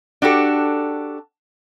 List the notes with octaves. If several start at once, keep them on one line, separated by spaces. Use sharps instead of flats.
D4 F#4 G4 A4